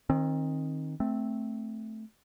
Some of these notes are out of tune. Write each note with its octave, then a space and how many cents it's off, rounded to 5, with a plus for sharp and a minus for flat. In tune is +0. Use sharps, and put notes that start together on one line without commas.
D#3 +0 C4 +30
A3 +0 C4 +0